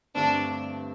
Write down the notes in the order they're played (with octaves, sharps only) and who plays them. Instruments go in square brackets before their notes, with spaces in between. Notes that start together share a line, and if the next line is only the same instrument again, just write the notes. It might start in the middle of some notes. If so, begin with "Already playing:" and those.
[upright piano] G2 D3 A3 C4 [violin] D4